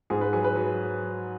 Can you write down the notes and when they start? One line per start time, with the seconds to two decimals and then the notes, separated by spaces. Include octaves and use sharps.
0.10 G#2 G#4
0.21 B4
0.33 F#3 G#4
0.44 B4
0.56 F#3